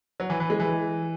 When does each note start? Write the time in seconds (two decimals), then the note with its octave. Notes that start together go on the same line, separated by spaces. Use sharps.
0.20 F#3
0.30 E3
0.40 E3
0.50 G#3
0.60 E3